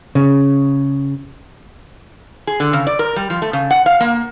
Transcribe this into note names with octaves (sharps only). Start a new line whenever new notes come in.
C#3
G#4
D3
C#3
D5
A#4
G3
F3
A3
C#3
F#5
F5
A#3